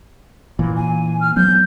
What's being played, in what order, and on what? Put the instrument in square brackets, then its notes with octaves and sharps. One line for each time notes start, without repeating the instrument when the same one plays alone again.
[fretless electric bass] A#2 E3
[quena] G#5
F6
[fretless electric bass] F3 F#3 B3 [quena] G6